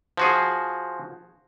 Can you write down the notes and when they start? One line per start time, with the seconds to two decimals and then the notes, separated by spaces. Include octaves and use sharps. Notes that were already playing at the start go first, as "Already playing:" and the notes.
0.17 F3 F#4 G#4